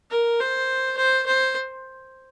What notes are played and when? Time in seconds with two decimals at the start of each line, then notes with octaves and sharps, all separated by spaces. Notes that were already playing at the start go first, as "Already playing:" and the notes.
0.11 A#4
0.40 C5
0.97 C5
1.26 C5